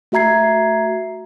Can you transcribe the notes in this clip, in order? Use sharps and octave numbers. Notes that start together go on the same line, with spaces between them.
A3 F#4 E5 A#5 G#6 C7